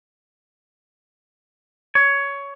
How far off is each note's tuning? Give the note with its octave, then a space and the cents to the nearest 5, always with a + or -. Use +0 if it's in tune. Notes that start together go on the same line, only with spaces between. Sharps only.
C#5 +15